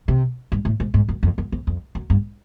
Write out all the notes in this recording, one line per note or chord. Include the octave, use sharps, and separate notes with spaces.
C3
G2
A2
G#2
G#2
F#2
F2
F#2
F2
F2
F#2
G2